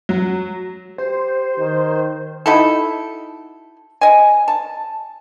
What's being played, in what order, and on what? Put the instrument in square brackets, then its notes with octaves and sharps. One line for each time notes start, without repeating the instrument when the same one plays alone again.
[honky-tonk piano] F#3
[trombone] G4 [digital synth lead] C5
[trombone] D#3
[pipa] D#4 E4 F#4 A4
D#5 G#5
A5